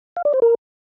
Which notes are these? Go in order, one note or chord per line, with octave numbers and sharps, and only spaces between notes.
F5
D5
C5
A#4